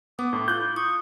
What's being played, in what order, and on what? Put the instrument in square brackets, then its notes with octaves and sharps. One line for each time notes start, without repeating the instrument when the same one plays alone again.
[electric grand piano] B3 [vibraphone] D6 [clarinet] D#6
[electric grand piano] A2 [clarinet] D4
[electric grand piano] F4 F#6 [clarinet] A4 [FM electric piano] G6
[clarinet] E4
[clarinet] C#6 [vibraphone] D#6